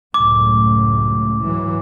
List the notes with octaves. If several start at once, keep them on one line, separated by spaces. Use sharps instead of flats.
C#2 F#2 A2 D6
G#2 E3 F#3